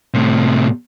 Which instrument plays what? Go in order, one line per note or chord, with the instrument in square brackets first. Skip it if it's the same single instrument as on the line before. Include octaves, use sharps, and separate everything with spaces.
[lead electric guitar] A2 C3